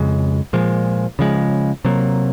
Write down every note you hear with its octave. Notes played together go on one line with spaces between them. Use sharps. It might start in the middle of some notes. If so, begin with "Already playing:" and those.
Already playing: F2 C#3 G#3
A#2 F3 G#3
C#3 F3 G#3
C3 F#3 A#3